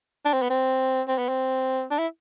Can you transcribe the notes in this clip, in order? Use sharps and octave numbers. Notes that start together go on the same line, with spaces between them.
D4
C4
B3
C4
C4
B3
C4
D4
E4